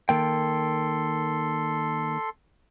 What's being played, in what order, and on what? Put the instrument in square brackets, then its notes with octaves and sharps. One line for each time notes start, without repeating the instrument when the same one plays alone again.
[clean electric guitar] D#3 A#3 G5 [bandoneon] A4 C6